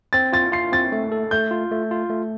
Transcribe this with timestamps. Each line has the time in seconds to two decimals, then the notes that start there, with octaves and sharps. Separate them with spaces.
0.13 C4 A6
0.33 F4 A6
0.52 F4 C7
0.72 C4 A6
0.92 A3
1.12 A4
1.31 A3 G6
1.51 F4
1.71 A3
1.91 F4
2.10 A3